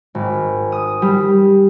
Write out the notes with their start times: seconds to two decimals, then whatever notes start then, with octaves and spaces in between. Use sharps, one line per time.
0.15 G#1
0.72 D#6
1.02 G3